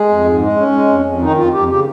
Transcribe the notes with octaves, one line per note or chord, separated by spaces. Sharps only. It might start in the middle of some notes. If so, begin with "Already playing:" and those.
Already playing: G#3 G#4
F2
G#2
G#3
C#4
G#3
F2
F2
D#3 D#4
F2 F4
F2 G4
C#3 G4